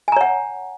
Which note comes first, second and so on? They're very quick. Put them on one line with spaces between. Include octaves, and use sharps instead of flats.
G#5 A#5 C#5 F#5